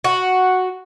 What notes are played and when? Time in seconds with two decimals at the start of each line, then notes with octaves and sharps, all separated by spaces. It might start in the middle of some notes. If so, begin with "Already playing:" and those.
0.04 F#4